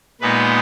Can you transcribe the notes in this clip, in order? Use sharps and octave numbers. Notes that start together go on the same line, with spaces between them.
A#2 G#3 B3 D#4 B4